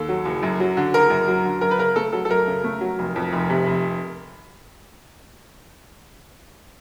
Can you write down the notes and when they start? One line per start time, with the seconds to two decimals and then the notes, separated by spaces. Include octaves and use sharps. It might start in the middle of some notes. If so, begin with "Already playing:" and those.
Already playing: D#2 A4
0.09 F#3
0.25 F#1
0.43 F#2
0.60 F#3
0.77 D3
0.94 F#1 A#4
1.10 F#2
1.28 F#3
1.45 D3
1.61 F#2 A#4
1.71 B4
1.79 C#3 A#4
1.96 A3 A4
2.13 F#3 A4
2.25 A4
2.29 F#2 A#4
2.48 C#3
2.64 A3
2.81 F#3
2.99 F1
3.16 F2
3.33 F1
3.50 C3
3.66 F1